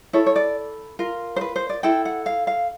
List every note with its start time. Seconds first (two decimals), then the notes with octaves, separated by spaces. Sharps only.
0.13 E4 A4 C#5
0.26 C#5
0.36 D5
0.99 F4 A#4
1.36 C5
1.41 B4
1.56 C5
1.69 D5
1.83 E4 A4 G5
2.05 F#5
2.26 F5
2.47 F5